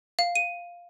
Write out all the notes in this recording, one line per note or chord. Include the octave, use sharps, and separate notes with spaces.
F5
D#7